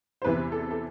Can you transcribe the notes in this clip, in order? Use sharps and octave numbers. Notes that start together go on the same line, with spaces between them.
C5
E2 C3 E3 B4
A4
A4